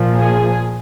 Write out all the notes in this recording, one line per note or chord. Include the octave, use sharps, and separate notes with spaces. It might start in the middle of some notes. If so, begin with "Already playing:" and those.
Already playing: A#2 F3
G#4